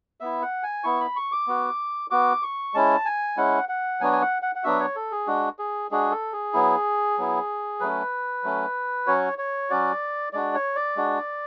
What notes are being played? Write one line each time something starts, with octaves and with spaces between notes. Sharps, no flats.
B3 E4 E5
F#5
G#5
B3 E4 C#6
B5
C#6
D6
B3 F#4
B3 F#4 D6
C#6
G#3 C#4 E4 A5
G#5
G#3 C#4 E4 F#5
F#5
F#3 B3 D4 F#4 G#5
G#5
F#5
F#5
F#5
F#3 B3 D4 F#4 E5
C#5
A4
G#4
G#3 D4 F#4
G#4
G#3 D4 F#4 G#4
A4
G#4
F#3 B3 E4
F#3 B3 E4
F#3 A3 C#4 B4
F#3 A3 C#4
F#3 C#4 F#4 C#5
C#5
F#3 C#4 F#4 D5
G#3 D4 F#4 D5
C#5
D5
G#3 D4 F#4